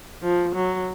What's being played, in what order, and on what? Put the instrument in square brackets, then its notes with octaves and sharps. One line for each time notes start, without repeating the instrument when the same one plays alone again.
[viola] F3
F#3